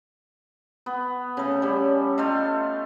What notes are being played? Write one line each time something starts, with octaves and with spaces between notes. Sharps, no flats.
B3
C#3 A3
G3 C#4
A3 F4 D#5 F5